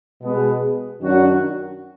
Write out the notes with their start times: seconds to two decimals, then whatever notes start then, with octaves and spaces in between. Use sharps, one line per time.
0.22 B2 G#3 B3
1.00 F#2 D#3 F#3 D4 F#4